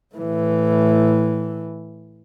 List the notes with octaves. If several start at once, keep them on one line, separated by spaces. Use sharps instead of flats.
A2 E3